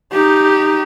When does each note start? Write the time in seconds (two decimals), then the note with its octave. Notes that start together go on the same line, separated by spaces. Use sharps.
0.13 D#4 G4